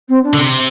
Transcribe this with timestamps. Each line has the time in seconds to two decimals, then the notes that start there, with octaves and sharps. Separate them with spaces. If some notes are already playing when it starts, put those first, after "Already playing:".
0.08 C4
0.23 D4
0.34 D3
0.38 C3